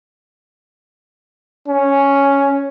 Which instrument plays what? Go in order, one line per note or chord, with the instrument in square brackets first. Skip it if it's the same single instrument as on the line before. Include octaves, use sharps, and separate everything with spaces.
[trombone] C#4